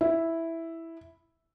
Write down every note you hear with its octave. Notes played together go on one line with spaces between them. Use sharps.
E4